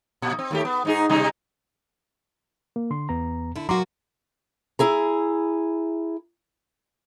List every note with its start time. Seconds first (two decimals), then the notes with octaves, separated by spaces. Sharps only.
0.22 A#2
0.39 C4
0.51 D#2 A3 G4
0.65 B3
0.85 G#2 D#4 G#4
1.10 C3 G3 D#4
2.76 A#3
2.91 D3 C6
3.09 E2 B3 A#5
3.56 D3 E4
3.69 F#3 A#3 F#4 A#5 C6 D6
4.79 E4 G#4 A#5